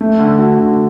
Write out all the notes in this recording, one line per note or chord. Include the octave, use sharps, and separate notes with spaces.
A3
D3
F#4
D3